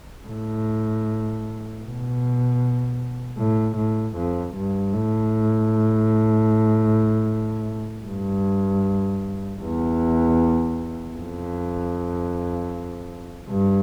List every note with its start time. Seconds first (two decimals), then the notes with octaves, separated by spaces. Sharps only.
0.28 A2
1.82 B2
3.38 A2
3.77 A2
4.17 F2
4.55 G2
4.93 A2
8.05 G2
9.60 E2
11.16 F2
13.48 G2